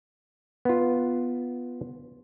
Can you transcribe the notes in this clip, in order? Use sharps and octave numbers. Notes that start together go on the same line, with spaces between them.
B3 F4